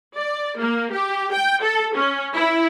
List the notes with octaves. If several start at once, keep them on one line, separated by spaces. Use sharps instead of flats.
D5
A#3
G4
G5
A4
C#4
E4